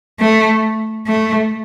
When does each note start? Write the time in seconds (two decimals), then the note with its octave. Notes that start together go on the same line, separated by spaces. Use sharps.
0.20 A3
1.06 A3